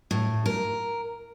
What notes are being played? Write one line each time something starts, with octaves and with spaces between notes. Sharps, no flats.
A2
A#4